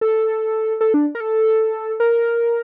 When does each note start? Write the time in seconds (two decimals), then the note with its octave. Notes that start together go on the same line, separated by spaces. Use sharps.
0.01 A4
0.81 A4
0.94 D4
1.15 A#4
1.20 A4
2.00 A#4